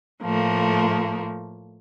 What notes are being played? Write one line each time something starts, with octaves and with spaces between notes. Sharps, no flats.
A2 F3 A3 A#3